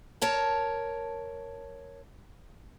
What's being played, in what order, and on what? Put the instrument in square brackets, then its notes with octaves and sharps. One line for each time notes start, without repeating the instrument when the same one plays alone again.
[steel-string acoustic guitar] A#4 C#5 A5